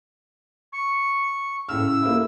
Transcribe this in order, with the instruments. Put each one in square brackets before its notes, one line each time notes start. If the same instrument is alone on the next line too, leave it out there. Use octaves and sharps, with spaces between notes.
[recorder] C#6
[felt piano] A2 C#3 F6 [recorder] E6
[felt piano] A#3 E4